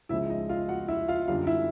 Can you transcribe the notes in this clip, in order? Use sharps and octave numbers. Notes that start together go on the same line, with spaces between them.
C#2 C#3 F3 G#3 E4 E5
D#4 D#5
F4 F5
F#4 F#5
E4 E5
F4 F5
F#2 D3 G3 F4 F5
E4 E5